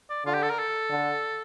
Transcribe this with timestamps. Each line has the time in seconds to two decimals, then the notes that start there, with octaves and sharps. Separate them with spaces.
0.10 D5
0.25 D3 F4
0.34 G4
0.43 A4
0.50 A#4
0.59 A4
0.91 D3